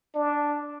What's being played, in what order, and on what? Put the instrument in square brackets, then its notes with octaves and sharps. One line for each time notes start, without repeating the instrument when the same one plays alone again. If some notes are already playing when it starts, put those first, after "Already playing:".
[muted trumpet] D4